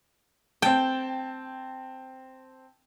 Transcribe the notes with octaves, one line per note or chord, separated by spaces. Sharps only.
C4 G5 A5